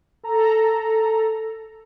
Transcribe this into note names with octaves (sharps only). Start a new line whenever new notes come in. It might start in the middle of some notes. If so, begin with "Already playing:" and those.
A4 A#5